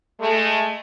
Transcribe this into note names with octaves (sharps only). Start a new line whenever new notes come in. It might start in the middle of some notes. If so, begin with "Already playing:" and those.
G#3 A3